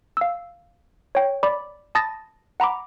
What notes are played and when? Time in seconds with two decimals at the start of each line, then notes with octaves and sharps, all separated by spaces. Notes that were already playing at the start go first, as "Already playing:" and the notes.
0.17 F5 E6
1.15 C#5 G5
1.43 D5 B5 D6
1.95 A5 B5 D#6 A6 A#6
2.60 F#5 A#5 B5 D6